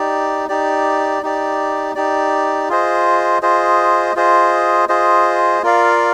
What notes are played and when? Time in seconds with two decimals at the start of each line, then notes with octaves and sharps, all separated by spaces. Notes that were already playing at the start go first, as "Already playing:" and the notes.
Already playing: D#4 G4 D5
0.49 D#4 G4 D5
1.22 D#4 G4 D5
1.95 D#4 G4 D5
2.69 F4 G#4 C5 D#5
3.42 F4 G#4 C5 D#5
4.16 F4 G#4 C5 D#5
4.89 F4 G#4 C5 D#5
5.63 F4 A#4 D5 F5